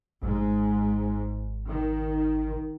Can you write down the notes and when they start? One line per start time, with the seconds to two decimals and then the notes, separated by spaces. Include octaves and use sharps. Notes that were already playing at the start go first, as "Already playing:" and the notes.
0.23 G#1 G#2 G#3
1.68 D#3